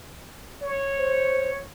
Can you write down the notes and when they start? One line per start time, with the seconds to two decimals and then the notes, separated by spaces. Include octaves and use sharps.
0.62 C#5
0.98 C5